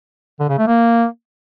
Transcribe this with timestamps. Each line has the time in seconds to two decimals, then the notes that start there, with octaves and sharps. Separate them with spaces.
0.40 D3
0.49 C#3
0.58 A3
0.67 A#3